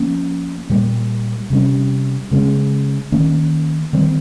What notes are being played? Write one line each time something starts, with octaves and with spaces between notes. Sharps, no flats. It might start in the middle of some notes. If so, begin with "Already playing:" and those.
Already playing: F3 A#3 C#4
A#2 G3 A#3
C3 G3 C#4
C#3 G#3 C#4
D#3 A#3 C#4
D#3 G3 C4